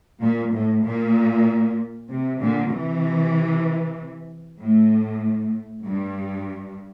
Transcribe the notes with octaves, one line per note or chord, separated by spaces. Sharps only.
A#2
A2
A#2
C3
A#2 D3
C3 E3
A2
G2